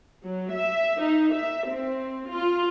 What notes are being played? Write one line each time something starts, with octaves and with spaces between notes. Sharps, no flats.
F#3
E5
D#4
E5
C4
F4